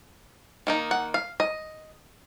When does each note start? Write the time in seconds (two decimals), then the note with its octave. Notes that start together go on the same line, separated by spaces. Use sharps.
0.67 D#3 A#3 D#4
0.91 F#5
1.14 F5
1.40 D#5